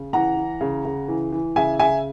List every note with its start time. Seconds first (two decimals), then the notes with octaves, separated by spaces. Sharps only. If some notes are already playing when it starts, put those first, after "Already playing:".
Already playing: C#3
0.13 E3 F#5 A#5
0.37 E3
0.61 C#3
0.85 C#3
1.08 E3
1.32 E3
1.56 C#3 E5 G#5
1.79 C#3 E5 G#5